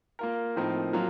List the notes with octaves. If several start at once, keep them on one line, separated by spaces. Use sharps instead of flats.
A#3 F4 A#4
A2 F3 C4 D#4 A#4
F#3 A#3 F4